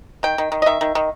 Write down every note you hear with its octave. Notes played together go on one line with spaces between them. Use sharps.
D#3 G5
D#3
D#3
D#5
D#3 E5
D#3
D#3